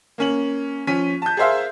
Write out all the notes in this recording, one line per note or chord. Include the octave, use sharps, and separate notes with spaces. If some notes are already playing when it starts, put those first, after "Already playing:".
A#3 C#4 F#7
F3 C#4 B6 D#7
A5 G6
G#4 A#4 C5 E5 F5